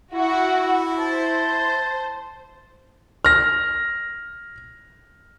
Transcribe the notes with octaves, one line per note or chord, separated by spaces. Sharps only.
E4 F#4
C5 A5
F6 A#6